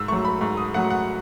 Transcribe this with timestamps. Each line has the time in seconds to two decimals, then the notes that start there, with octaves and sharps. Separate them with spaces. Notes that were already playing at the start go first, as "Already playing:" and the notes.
Already playing: G#2 E6
0.08 A3 C#6
0.12 F#3
0.25 B5
0.41 G#2 C#6
0.57 D#6
0.74 F#3 A3 F#5
0.90 F#5